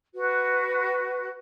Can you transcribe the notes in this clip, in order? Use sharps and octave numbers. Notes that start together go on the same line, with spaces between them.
F#4 B4